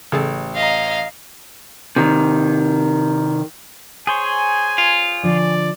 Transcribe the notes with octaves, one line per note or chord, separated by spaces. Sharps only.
A1 C#3 G#4 A4
D#5 F5 A#5
C3 D#3
G#4 C5 C#5 G#5
F4
D3 F3 D5